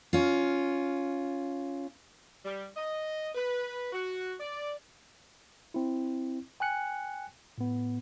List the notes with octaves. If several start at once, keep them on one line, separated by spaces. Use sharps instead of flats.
C#4 F4
G3
D#5
B4
F#4
D5
C4 E4
G5 G#5 F#6 C#7
A2 B3